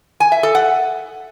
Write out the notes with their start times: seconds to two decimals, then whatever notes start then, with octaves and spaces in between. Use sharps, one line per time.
0.20 G#5
0.32 E5
0.43 A4
0.55 F#5